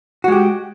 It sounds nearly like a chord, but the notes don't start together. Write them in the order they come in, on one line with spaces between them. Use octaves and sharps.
F#4 G#3 G4